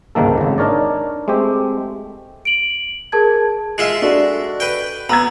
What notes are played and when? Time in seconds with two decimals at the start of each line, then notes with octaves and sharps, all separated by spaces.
0.15 G1 C#2 G#2 D#3 A#3 A4
0.38 G#1 C#3
0.58 D4 D#4 A#4 C#5 D5
1.28 G#3 A3 C4 G4
2.45 D7 F#7
3.12 G#4 A#4 A5 G#6
3.78 G#3 F4 E5
4.02 D4 F#4 A4
4.60 B4 G5
5.09 B3 A#5 E6 G#6